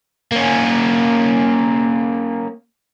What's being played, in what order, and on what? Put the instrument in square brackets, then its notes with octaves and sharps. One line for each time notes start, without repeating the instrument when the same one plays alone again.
[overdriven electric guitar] A#3 C#4